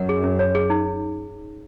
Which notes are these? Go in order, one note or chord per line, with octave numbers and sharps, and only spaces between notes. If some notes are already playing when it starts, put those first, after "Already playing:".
Already playing: F#2 F#5
G#4
C#4
C#5
G#4
D#4